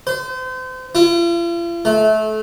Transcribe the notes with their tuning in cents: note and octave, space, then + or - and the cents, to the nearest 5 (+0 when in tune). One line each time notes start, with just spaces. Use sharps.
C5 -35
F4 -45
A3 -25